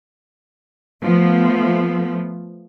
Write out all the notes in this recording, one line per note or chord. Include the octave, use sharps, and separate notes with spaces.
F3 A3 B3